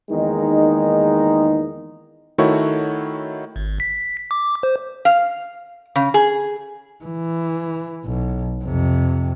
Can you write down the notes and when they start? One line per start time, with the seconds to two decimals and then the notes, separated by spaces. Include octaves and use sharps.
0.10 E2 D#3 G#3 A#3 D#4
2.38 D#3 A3 E4 F#4 C#5
3.56 G#1
3.80 B6
4.31 D6
4.63 C5
5.05 F5
5.96 C#3
6.14 G#4
7.04 E3
8.05 B1
8.64 F2 C3